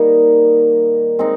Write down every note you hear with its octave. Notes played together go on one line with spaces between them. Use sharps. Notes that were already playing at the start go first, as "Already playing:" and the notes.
Already playing: D#3 G3 A#3 D#4
G#3 C4 D#4